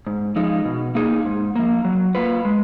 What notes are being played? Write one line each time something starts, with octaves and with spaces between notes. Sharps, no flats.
G#2
F3 G#3 D#4
B2
A#3 D#4 G#4
G#2
F3 A#3
F#3
A#3 F4 B4
G#3